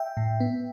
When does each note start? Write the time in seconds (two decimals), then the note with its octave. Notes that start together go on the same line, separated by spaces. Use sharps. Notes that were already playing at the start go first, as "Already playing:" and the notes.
Already playing: E5 G5
0.17 A2
0.40 B3